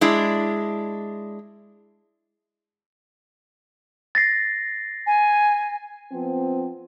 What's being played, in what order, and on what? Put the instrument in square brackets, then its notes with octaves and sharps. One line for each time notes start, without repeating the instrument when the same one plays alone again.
[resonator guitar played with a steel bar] G#3 D4 E4
[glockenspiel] A6 A#6 C7
[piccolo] G#5
[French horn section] F3 B3 C4